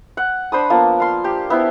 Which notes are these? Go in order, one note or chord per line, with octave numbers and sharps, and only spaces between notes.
F#5
D4 C5 B5 D#6
F3 A#3 B3 A5
F5 C6
G4
B3 E4 C5